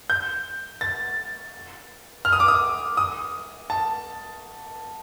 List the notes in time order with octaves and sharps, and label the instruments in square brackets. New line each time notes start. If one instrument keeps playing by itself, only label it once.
[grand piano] G6
A6
F6
D#6
D6
D#6
D#6
A5